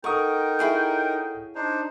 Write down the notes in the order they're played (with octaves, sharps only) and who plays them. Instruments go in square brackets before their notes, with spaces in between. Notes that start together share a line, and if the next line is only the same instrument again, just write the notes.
[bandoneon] D#4 A#4 [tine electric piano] A4 F#5 D#6 [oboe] G5 [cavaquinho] C#6
[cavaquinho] E4 G#4 C#5
[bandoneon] D4 D#4 C5